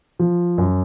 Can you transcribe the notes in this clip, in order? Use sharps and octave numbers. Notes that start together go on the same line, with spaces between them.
F3
F#2